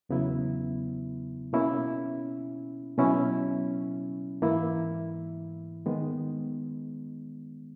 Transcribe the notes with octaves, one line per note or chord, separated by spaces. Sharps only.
E2 C#3 F#3 B3 E4
B2 A#3 C#4 E4
B2 F#3 C#4 E4
G#2 E3 A#3 E4
D#3 G#3 B3